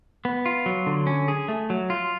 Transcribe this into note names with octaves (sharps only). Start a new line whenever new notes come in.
B3
F4
F#3
D3
C#4
G#4
A3
F#3
F4